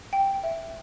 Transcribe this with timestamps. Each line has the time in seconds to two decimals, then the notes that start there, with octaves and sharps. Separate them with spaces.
0.13 G5
0.43 E5